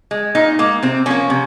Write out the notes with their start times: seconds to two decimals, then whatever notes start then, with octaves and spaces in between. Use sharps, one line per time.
0.11 G#3
0.35 A#2 D#4
0.59 G#3 A#3
0.83 C3 C4
1.06 F3 A#3 C#4
1.30 C3